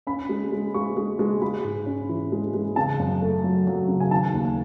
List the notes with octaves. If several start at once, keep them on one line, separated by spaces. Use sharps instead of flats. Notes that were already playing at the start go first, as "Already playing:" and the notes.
C#4 B5
G#3
G#3
G#3 C#6
G#3
G#3
G#3 B5
G#2
C#4
E3
G#3
G#3
C#3 A5
F#2
A3
F#3
F#3
C#3
G#5
D#3 A5
D#2